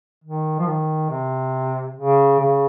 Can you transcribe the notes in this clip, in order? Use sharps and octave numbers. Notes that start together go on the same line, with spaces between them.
D#3
F3
D#3
C3
C#3
C#3